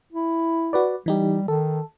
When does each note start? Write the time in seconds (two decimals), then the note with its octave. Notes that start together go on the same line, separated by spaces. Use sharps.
0.13 E4
0.73 F#4 B4 D5
1.06 E3 G3 D#4 G4
1.48 D#3 A4